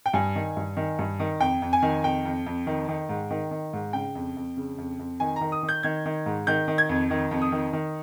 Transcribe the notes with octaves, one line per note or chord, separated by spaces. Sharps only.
G5
G2 G#5
D#3
G2
D#3
G2
D#3
F2 G5
F2
G#5
D#3
F2 G5
F2
F2
D#3
D#3
G#2
D#3
D#3
G#2
C#3 G5
F2
F2
C#3
F2
F2
D#3 G#5
A#5
D#3
D#6
D#3
G6
D#3 G#6
D#3
G#2
D#3 G6
D#3
G#6
F2
D#3
F2
D#6
D#3
D#3